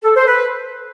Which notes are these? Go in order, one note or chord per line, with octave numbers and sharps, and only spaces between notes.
A4
C5
B4